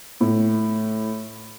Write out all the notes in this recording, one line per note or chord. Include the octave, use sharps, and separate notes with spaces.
A2